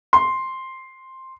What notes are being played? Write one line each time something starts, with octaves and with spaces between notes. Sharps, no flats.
C6